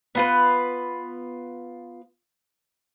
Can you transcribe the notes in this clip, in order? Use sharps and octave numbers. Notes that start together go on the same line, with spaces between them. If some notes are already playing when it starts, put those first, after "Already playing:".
B3 F4 B4